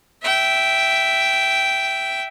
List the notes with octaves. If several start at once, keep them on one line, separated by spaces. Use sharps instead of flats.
E5 G5